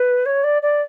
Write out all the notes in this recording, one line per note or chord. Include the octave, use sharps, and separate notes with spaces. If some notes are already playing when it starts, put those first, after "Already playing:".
Already playing: B4
C#5
D5
D5